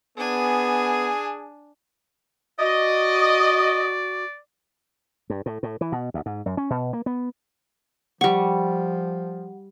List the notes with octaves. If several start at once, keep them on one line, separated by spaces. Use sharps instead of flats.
B3 D4 G#4 G#5
F#4 D5 D#5
G2
A2
A2
E3
B2
D2
G#2
F#2
C#4
B2
A#3
B3
F3 G3 G4 F#5 C#6